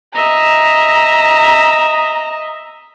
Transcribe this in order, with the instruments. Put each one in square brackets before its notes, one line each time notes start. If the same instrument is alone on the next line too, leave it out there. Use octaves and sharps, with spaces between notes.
[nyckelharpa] D#5 E5 [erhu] A#5